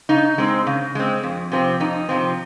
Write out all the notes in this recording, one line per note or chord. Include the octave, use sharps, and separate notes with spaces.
C#3 D#4
G#3 C4
C#3
G#3 C4
F2
C3 F3 C4
F2 D#4
C3 F3 C4